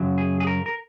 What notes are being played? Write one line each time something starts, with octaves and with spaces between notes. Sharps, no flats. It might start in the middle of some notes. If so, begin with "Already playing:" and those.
Already playing: F#2 C#3 F#3
G#4
G#4
A#4
A#4